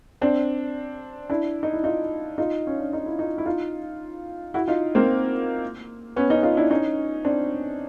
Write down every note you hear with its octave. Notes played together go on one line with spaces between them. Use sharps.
C4 D4
D4 E4
D#4
E4
D#4 F4
D#4 F4
C#4
D4
D#4
E4
D#4 F4
E4
D#4 F4
E4 F#4
D#4 F4
A#3 C4
B3 C#4
C#4 D#4
D#4 F4
D4 E4
C#4 D#4
C4 D4